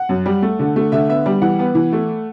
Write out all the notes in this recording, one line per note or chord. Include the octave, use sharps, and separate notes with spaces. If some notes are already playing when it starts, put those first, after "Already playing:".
Already playing: F#5
F#2
G3
A3
D3
A3
D3 E5
B3 E5
G3
E3 F#5
B3
E3
A3